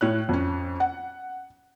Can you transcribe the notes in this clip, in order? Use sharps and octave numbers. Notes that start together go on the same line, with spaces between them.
A2 C#5 F#6
F2 C#4
F#5